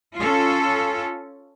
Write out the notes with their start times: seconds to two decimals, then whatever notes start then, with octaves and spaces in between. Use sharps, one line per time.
0.20 C#4 F4 A4